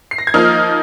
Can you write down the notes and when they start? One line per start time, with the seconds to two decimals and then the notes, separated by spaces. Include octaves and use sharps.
0.11 C7
0.18 A#6
0.27 G#6
0.34 F3 A#3 D#4 F6